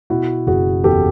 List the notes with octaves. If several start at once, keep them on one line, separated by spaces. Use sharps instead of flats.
B2 E4 F#4
F#1 F#4 G#4
E2 G4 A4